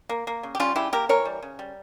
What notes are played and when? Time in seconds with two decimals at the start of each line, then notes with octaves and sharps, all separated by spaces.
0.09 A#3
0.27 A#3
0.43 C#3
0.55 G4
0.60 G3 C#4 F4
0.76 C#3 E4 G4
0.92 A#3 G4 A#4
1.09 E3 A#4 C#5
1.25 G3
1.42 C#3
1.59 G3